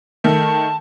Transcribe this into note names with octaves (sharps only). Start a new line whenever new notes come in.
D#3 A3 A5